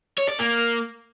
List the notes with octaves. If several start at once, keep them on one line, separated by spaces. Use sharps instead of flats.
C#5
D5
A#3